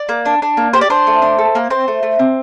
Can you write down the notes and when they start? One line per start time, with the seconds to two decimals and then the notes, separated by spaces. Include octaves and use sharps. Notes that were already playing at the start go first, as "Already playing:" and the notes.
Already playing: D5
0.09 A#3
0.26 D4
0.42 D4
0.57 A#3
0.73 G4 C5
0.81 D5
0.90 D4 C5
1.07 A3
1.22 D4
1.38 A4
1.55 A#3
1.70 C4 C5
1.88 A3
2.03 A3
2.19 C4